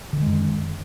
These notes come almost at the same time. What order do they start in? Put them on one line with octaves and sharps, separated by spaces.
D3 D#3 G#3 F#2